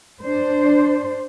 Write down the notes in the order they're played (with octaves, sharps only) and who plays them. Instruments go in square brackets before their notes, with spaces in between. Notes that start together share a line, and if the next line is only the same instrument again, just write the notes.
[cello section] D4 C5